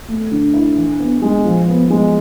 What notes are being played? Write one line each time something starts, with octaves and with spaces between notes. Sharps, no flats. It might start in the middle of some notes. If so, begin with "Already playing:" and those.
A3
D3
E4
E3
B3
G#3
F3
B3
G#3